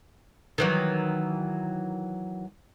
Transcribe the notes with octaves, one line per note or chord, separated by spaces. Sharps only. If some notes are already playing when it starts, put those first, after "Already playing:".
D#3 E3 F#3